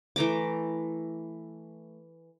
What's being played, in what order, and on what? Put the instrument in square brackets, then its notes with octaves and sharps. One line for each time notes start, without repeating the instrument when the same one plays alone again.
[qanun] E3 A3 A#5 D6